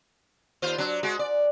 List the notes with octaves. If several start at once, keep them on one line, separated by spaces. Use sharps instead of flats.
D#2 F4 C5
F#3 D4
G#3 F#4
D5